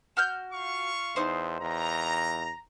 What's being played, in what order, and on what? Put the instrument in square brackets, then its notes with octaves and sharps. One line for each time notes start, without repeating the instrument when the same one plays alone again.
[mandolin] F#4 F6 G6
[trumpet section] F4 F5 C#6
[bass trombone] E2 [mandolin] D#4 C5
[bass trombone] E2 [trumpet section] A#5